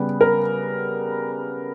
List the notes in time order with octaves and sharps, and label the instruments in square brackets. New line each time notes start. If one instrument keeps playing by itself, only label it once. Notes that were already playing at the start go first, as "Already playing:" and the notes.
Already playing: [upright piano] C#3 G3 B3 B4
A#4